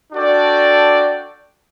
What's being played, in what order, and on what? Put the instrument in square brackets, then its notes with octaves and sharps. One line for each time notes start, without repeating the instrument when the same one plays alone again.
[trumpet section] D4 F#4 A4 D5 G5